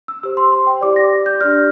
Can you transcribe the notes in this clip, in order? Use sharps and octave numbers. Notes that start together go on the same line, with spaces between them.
E6
G4 C5 E6
C6
C6
G5
E4 G4 D5 D6
A#6
G6
D4 G4 D5 F6